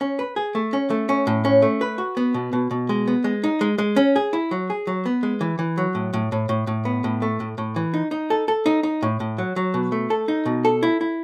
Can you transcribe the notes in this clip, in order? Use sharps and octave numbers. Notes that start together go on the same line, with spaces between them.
C#4
B4
G#4
A3
C#4
A3
C#4
A2
C#4
A3
B4
F#4
B3
B2
B2
B2
G#3
B3
G#3
D#4
G#3
G#3
C#4
G#4
E4
F#3
G#4
F#3
B3
G#3
E3
E3
F#3
A2
A2
A2
A2
A2
B3
A2
A3
A2
A2
E3
D#4
D#4
A4
A4
D#4
D#4
A2
A2
F#3
F#3
B2
A3
A4
D#4
B2
A4
E4
E4